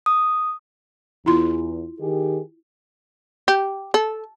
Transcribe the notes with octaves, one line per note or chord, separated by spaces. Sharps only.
D#6
E2 E4 F4 C6
D#3 G4 G#4
G4
A4